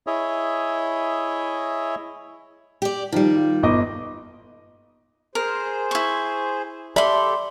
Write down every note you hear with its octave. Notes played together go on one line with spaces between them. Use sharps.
E4 G#4 C#5 D#5 E5
G4 D5
D#3 F3 G3
F4
G1 D#5 D6
G#4 A#4 C5
E4 C#6
G4 A4 D5 E5 B5 C6